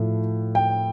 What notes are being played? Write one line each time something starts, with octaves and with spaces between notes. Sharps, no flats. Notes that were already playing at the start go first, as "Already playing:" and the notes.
Already playing: A2 F3 A3
G5